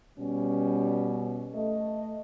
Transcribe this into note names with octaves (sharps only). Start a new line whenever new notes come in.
B2 G3 C#4
A3 D#5